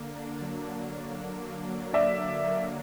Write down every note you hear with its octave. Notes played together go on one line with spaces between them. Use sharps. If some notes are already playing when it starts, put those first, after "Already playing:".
Already playing: D3 A#3
D4
F#3
F#3
D4
D4
A#3
F#3
D3 D5 E5
F#3
A#3